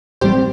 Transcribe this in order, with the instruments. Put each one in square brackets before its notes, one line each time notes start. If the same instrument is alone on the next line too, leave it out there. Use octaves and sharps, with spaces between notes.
[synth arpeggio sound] A1 A2 G3 C4 G4 C5